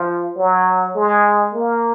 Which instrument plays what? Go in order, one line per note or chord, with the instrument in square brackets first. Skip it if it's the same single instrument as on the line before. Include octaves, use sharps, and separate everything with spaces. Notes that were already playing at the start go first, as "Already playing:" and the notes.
Already playing: [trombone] F3
F#3
G#3
A#3